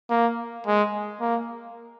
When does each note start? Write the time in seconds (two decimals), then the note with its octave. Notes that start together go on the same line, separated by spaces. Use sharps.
0.10 A#3
0.66 G#3
1.20 A#3